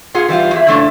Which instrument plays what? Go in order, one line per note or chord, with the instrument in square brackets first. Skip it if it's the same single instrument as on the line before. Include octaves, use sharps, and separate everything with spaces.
[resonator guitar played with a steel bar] A#2 F4 G#4 F#5
E3 G3 E4 F4
E2 G#4 E5
C#3 F3 A3 D4 E4